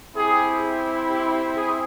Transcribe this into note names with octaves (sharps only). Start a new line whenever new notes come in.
C4 E4 G4 G#4
G4
G#4